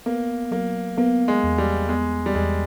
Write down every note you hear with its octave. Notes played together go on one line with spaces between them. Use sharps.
A#3 B3
F#3 A#3
A#3 B3
G#3
E2
G3
G#3 B3
G3
E2 G#3